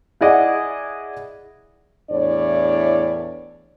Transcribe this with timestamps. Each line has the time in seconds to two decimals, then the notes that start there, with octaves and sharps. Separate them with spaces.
0.21 E4 G#4 D5 D#5 F#5
2.11 E2 A2 D4 C#5 D5